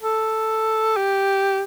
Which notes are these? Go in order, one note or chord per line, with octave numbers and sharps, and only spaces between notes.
A4
G4